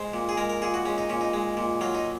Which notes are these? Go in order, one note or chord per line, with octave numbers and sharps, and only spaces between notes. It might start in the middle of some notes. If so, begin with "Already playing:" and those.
Already playing: G#3 C5
A#2
G#4
G#3 A#4
A#4
A#2 G#4
F#4
G#3 C#4
D#4
A#2 C#4
D#4
G#3
A#2
F#3 F4
D#4